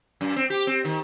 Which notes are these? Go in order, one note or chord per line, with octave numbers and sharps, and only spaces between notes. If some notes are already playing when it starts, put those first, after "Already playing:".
F#2
C4
G4
C4
D#3